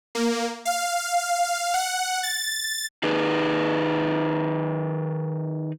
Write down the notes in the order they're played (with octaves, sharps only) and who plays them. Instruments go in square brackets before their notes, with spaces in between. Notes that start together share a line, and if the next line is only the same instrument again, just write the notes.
[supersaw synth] A#3
F5
F#5
A6
[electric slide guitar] D#3 D#4 G#4 B4